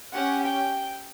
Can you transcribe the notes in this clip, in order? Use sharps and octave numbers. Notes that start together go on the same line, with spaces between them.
C#4 G4 F#5
G5